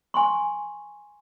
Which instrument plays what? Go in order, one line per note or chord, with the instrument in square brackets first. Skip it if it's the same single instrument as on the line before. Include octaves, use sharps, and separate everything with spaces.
[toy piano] G#5 C6 C#6